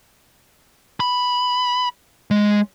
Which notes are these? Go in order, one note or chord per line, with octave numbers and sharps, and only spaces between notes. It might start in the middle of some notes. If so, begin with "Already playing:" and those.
B5
G#3